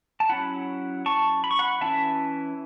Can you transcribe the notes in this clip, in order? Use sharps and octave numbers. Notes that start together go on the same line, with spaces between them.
A5
F#3 C#4 E4 F#5 B5
A5 C#6
B5
C#6
F#5 B5
E3 C#4 E4 E5 A5